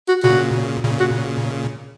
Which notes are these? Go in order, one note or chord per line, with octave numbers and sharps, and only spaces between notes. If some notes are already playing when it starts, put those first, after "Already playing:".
F#4
A#2 C#3 F#4
A#2 C#3
F#4